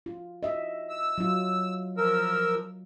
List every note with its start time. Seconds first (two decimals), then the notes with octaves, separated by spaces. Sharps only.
0.06 F4
0.43 D#5 E5
0.89 E6
1.18 F#3 F4
1.97 F3 A#4 E6